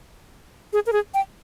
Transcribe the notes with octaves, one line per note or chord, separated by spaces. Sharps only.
G#4
A#4
G#4
G5